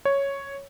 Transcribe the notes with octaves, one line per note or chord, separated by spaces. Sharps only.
C#5